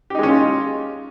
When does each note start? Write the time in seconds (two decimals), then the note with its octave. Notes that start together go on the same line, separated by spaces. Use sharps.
0.10 G4
0.15 D#4
0.19 G#3
0.23 C#4
0.28 F4